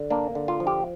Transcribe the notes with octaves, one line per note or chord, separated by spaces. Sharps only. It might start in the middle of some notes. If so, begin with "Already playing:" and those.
Already playing: D3
A#3 D4
D3
F4
F3
G4